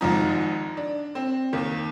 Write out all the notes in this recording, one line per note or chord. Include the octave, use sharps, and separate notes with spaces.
G#1 G#2 F3 D#4
D4
C4
D#2 D#3